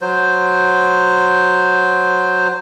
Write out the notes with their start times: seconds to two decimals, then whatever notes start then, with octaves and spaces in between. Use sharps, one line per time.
0.01 F#3 C5